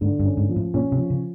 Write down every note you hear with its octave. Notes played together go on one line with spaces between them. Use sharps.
G#2 D3
G2
C#4
G#2
F3
A2
A#2 C#4
C3
F3
C#3